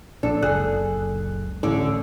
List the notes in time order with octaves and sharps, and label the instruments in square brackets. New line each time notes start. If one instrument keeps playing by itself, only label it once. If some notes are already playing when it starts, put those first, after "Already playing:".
[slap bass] A#1 A#2 [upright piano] D4 [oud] A4
[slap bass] F#1 C#2 [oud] G#4 [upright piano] F#6
[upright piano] A1 [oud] D3